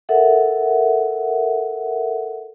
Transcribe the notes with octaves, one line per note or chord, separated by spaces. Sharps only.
A4 A#4 E5 F#5